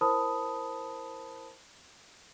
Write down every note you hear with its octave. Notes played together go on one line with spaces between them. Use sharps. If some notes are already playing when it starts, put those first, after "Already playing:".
E4 A#4 C5 A5 B5 D#6